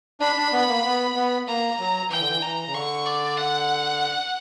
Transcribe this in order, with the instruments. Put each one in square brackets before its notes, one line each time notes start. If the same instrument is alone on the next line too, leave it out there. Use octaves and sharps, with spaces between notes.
[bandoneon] D4 [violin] B5
[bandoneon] D4
B3
A#3
B3
B3
[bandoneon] A#3 [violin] A#5
[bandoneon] F#3
[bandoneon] E3 [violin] G5
[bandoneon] D3
E3
[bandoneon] E3 [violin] A#5
[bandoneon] C#3
[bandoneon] D3 [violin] C#6
[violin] D5
F#5